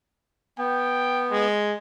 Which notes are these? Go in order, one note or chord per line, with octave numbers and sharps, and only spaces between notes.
B3 G5
G#3